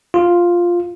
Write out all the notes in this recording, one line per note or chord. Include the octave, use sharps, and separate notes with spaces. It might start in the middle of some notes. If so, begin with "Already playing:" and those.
F4